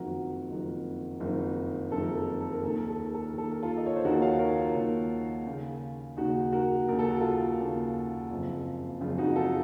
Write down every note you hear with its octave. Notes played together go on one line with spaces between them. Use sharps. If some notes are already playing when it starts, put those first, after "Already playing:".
Already playing: F#1 F2 D#3 F#4 A#4
F#1 F2 D#3
F#1 F2 D#3
F#1 F2 D#3 A4
A#4
A4
A#4
A4
A#4
D#2 D#3 A4
A#4
A4
A#4
A4
A#4
D#2 D#3 A4
A#4
F4 A4
D#5
C#5
C5
D#2 D#3 F#4 A#4
C#5 F5
A#4 C#5
F4
D#2 D#3
D#2 C#3
D#2 C#3 D#4 F#4
F#4 A#4
D#2 C#3 A#4
A4
F#4
F4 A4
D#2 C#3
F#1 F2 C#3
F#1 F2 C#3 F4
D#4 F#4
F4 A4